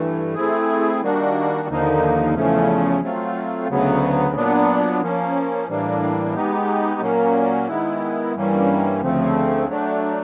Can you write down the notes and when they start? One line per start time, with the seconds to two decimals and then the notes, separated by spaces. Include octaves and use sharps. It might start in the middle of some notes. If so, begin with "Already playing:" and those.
Already playing: G2 E3 A3
0.35 A3 C4 E4 G#4
1.01 D#3 G3 A#3 D4 F#4
1.68 D#2 D3 F3 A#3 D#4
2.35 E2 C#3 F3 A3 C#4
3.01 F#3 A3 C4 F4
3.68 D2 C#3 F#3 B3
4.35 A#2 F#3 B3 D4
5.01 F3 A#3 C#4
5.68 A2 E3 G3 A#3 D4
6.34 G#3 B3 D#4 G4
7.01 A#2 F#3 A#3 C#4
7.68 D#3 G#3 B3 E4
8.35 G2 E3 G3 A#3 C#4
9.01 D2 C#3 F3 A3 C4
9.68 F#3 A3 D4